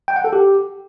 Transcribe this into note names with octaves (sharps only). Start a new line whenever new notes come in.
G5
F#5
A4
G4